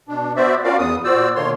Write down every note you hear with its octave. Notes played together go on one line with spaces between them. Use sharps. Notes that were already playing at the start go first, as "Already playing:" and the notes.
B2 D4
B3 F#4 C5 D5 E5
C#4 F4 F#4 A#4 D5 F5
E2 B3 D#6
A#2 F#4 C5 D5 E6
B2 D3 D#3 A#3 C#5 C6